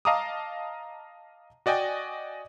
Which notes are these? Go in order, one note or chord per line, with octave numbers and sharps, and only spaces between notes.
D#5 F5 A5 A#5 D6 D#6
F#4 D5 D#5 G5 G#5